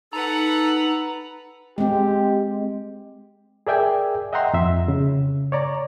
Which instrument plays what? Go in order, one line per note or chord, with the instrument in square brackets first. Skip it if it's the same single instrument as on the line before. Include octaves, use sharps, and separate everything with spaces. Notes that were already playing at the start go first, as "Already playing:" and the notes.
[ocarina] D#4 [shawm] A4 [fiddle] B4 F#5 [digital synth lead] A#5
[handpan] G#3 C4 [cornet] G4
[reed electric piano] G#4 A#4 D5 E5 G5 G#5
D#5 E5 F#5 G5 A#5 C6
F2 E5
C#3
C#5 D5 A#5